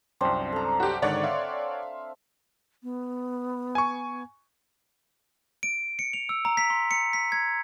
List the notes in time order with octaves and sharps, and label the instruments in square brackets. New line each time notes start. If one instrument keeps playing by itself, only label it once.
[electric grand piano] C2 F#2 [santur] C4 D4 C5
[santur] A4 A#5
[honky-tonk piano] F#4 G4
[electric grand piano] G#2 D3 D#3 [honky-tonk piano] C#5 D5 F#5
[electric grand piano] E5 F5 C6
[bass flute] B3
[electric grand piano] G#5 C#6
[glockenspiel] D7
C#7
F7
E6
A#5
B6
C6
C#7
B6
G#6